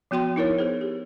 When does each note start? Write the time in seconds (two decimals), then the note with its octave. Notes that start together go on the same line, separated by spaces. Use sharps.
0.11 F3 B3 F#4 G5 C6
0.36 D#4 E4 A#4 C#5
0.59 B3 G#4 C5
0.81 G4